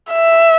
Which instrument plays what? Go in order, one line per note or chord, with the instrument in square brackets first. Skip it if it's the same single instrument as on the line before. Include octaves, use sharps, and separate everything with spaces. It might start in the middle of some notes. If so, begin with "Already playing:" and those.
[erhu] E5